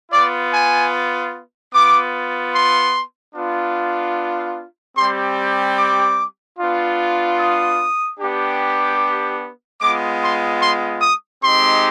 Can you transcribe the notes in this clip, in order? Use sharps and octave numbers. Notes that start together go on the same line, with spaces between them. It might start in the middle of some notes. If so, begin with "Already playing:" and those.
B3 F4 D5
G#5
B3 F4 D6
C6
B3 D4 F4
G3 C4 G4 C6
D6
B3 D4 F4
D#6
B3 D4 G4
G#3 B3 F4 D6
C6
C6
D#6
G#3 C4 D#4 G4 C6